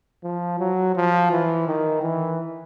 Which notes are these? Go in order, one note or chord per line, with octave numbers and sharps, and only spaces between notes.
F3
F#3
F3
E3
D#3
E3